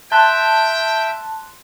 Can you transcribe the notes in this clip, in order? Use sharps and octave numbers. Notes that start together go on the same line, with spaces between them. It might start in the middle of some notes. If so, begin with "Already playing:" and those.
E5 G5 A5 C6 F#6 G7